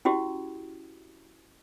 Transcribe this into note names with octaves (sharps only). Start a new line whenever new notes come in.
C#4 E4 F#4 G4